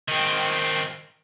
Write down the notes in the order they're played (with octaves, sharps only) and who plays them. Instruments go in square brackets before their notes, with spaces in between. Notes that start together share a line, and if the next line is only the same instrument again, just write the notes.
[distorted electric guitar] D#3 C4